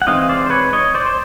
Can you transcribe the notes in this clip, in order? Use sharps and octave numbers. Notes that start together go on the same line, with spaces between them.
F#5
E3 G#3 C4 D#4 D#5 F5
C5 D5
C5
B4 C#5
C#5 D#5
C5 D5
C5